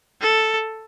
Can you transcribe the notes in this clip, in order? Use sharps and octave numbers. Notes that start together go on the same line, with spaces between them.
A4